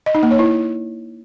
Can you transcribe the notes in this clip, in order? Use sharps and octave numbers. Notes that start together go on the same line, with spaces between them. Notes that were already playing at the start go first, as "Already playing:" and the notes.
D#5
D#4
A#3
C#5
E4